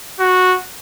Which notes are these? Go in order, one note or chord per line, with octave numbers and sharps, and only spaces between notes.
F#4